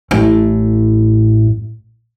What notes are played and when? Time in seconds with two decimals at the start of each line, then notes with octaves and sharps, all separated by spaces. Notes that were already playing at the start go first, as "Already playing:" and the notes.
0.11 A1 A2